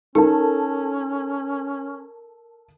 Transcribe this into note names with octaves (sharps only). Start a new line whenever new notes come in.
C#4 D#4 A4 A#4 A5